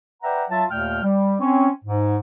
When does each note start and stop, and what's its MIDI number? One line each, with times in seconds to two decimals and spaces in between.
0.23 0.45 71
0.23 0.45 74
0.23 0.45 76
0.23 0.45 78
0.23 0.45 79
0.23 0.45 82
0.50 0.65 54
0.50 0.65 65
0.50 0.65 76
0.50 0.65 81
0.71 1.03 39
0.71 1.03 46
0.71 1.03 57
0.71 1.03 79
0.71 1.03 89
1.03 1.35 55
1.40 1.69 60
1.40 1.69 61
1.85 2.18 44